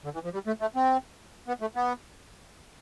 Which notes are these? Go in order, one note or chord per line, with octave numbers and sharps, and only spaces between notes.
D3
E3
F3
G3
A3
A3
C4
B3
A3
B3